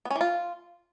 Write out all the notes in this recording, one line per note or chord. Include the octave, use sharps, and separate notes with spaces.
B3
C#4
E3
F4